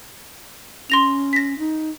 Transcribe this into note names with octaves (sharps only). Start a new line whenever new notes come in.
C#4 C6 A#6 F7
A#6 B6
D#4